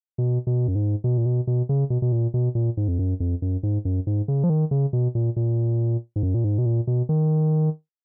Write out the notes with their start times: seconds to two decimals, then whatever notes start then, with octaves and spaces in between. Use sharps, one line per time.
0.18 B2
0.47 B2
0.68 F#2
0.75 G#2
1.04 B2
1.18 A#2
1.26 B2
1.47 B2
1.69 C#3
1.90 B2
2.02 B2
2.12 A#2
2.34 B2
2.55 A#2
2.77 G#2
2.88 F2
2.99 F#2
3.20 F2
3.42 F#2
3.63 G#2
3.85 F#2
4.07 G#2
4.28 C#3
4.44 F3
4.50 D#3
4.71 C#3
4.93 B2
5.15 A#2
5.36 A#2
6.16 G#2
6.23 F#2
6.34 A#2
6.44 G#2
6.58 B2
6.66 A#2
6.87 B2
7.09 D#3